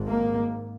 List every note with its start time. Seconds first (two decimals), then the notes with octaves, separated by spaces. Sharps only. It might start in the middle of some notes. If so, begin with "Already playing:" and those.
Already playing: G#1 G#2
0.08 A#3